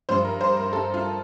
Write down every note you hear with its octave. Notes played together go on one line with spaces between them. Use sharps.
G2 F3 C5
A#4
C5
A#4
A4
F4